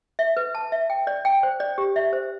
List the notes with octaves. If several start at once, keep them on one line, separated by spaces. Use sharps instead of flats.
E5
B4
A5
E5
G5
D5
G5
C5
D5
G4
E5
C5